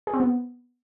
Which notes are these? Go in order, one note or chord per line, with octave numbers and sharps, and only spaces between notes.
G#4
C4
B3